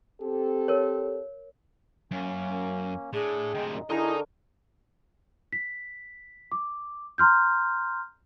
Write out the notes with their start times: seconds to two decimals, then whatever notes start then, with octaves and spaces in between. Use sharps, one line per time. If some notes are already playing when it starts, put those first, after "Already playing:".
0.22 C4 G4 A4
0.68 A#4 C#5
2.11 F#2 A#3 C#4
3.13 A2 D4 G#4
3.54 D2 C3 G#3 D#4 G5
3.69 F#2 A#2
3.90 D3 D#4 E4 G#4 A#4 D#5 A#5 C#6
5.52 B6
6.52 D6
7.18 A#5 C6 F6 G6